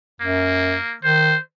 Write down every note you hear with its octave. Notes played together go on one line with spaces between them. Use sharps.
F#2 A#3
D#3 C5